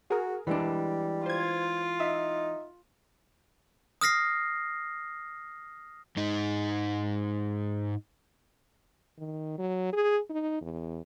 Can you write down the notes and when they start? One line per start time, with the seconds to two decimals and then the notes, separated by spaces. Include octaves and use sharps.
0.10 F#4 G#4 A#4
0.47 E3 G3 G#3 D4
1.26 F4 C5 G#6
2.00 D#4 E5
4.01 D#6 F6 A#6 C7
6.17 G#2 D#4
9.18 D#3
9.58 F#3
9.92 G#4
10.29 D#4
10.61 E2